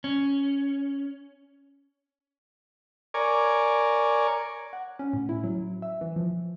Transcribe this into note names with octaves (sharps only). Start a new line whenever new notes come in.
C#4
A#4 C#5 D5 G#5
F#5
C#4
A2
E4
F#3
E5
E3
F3